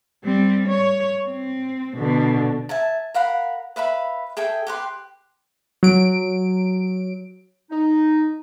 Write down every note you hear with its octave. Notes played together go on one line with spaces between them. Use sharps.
G3 C4
C#5
C4
B2 D3
E5 G#5 A5
A#4 F5 F#5 B5
B4 E5 F5 B5
G#4 A4 E5 G5
G4 B4 C6
F#3 D7
D#4